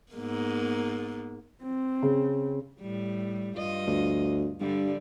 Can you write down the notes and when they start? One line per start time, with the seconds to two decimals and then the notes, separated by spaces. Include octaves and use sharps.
0.12 G#2 A#3 B3
1.63 C4
2.02 C#3
2.81 A2 G3
3.57 G2 F4 D#5
3.87 D2
4.61 G2 D3 G3